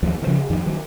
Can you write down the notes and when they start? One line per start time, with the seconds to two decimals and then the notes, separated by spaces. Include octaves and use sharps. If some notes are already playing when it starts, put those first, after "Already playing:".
0.03 D#2 F3
0.22 D#3
0.27 C#3 F3
0.50 F2 D#3
0.66 D#3 F#3